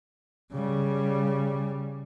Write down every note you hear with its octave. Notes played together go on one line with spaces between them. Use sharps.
C#3 G3